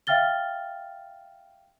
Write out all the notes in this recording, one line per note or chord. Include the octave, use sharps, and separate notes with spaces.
E5 F5 G5 F6 A6 G7